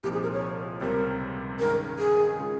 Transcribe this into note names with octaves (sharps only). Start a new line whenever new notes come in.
C2 A#2 F3 C4 D#4 G4
G#4
A#4
C#5
C#2 C3 G3 C4 A#4
G2 D#3 G#3 C#4 A#4
G#4
C#3 G#3 C#4 F4